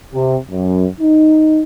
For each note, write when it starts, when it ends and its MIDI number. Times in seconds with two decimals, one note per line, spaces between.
0.14 0.36 48
0.51 0.86 42
1.01 1.63 63